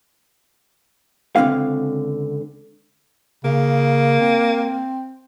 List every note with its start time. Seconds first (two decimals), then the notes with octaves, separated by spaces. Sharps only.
1.36 C#2 D3 F3 C4 D4 F5
3.44 C#3 A#3
4.21 C4